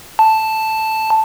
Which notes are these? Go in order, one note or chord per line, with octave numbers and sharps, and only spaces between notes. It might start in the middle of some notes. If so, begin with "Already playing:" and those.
A5